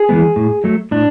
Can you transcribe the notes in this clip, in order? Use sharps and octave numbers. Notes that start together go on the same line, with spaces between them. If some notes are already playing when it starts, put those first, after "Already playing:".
Already playing: G#4
E3 G#3 B3
A2
F#3 A3
A2 D4